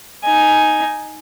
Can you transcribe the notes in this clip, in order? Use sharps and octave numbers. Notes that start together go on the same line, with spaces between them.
D#4 G#5